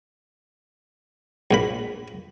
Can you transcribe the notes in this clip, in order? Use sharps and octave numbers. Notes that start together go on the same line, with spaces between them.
A#1 A#2 B5